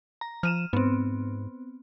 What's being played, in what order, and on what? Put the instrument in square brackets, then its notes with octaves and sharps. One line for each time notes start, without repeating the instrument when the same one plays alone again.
[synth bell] A#5
[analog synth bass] F3 [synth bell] F6 D#7 E7
[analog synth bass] G#2 [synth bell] B3 C4